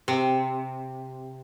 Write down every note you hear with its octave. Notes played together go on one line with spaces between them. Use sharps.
C3